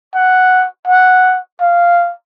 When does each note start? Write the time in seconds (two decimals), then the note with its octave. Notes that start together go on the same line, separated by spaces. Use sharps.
0.15 F#5
0.87 F#5
1.61 F5